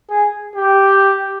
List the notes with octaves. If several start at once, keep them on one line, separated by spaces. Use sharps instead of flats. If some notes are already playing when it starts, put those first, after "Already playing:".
G#4
G4